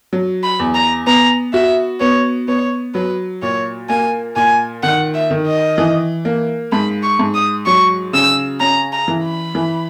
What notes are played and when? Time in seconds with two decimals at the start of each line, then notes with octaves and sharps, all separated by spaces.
0.13 F#3
0.43 B5
0.59 E2
0.74 A#5
1.07 B3 A#5
1.54 F#4 E5
2.00 B3 C#5
2.48 B3 C#5
2.94 F#3 B4
3.42 A#2 C#5
3.89 A#3 G#5
4.36 A#2 G#5
4.83 D#3 F#5
5.14 E5
5.31 D#3
5.47 D#5
5.78 E3
6.25 A#3
6.72 G#2 B5
7.03 C#6
7.19 G#2
7.34 D#6
7.66 F#3 C#6
8.13 C#3 E6
8.61 C#4 A#5
8.93 A#5
9.08 E3
9.23 B5
9.55 E3